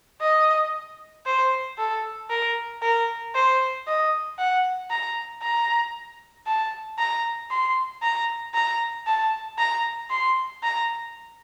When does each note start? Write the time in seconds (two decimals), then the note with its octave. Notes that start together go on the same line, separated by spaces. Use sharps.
0.22 D#5
1.26 C5
1.78 A4
2.30 A#4
2.82 A#4
3.35 C5
3.87 D#5
4.39 F#5
4.91 A#5
5.42 A#5
6.47 A5
6.99 A#5
7.51 C6
8.03 A#5
8.55 A#5
9.07 A5
9.58 A#5
10.11 C6
10.63 A#5